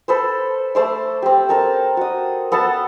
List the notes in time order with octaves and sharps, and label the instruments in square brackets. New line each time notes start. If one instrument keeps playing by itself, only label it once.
[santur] A4 B4 C5
A3 C5 D6
C4 G4
A4 A#4 A5
F#4 D#6
B3 A4 F#5 A5